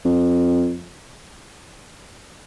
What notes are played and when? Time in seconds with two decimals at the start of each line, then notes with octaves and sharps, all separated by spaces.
0.05 F2